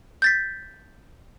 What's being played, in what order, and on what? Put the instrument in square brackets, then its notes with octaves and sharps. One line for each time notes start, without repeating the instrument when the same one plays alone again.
[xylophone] G6 A6 B6